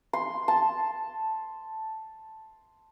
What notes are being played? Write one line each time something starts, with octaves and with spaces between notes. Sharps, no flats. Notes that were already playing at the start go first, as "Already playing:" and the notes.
C6
A5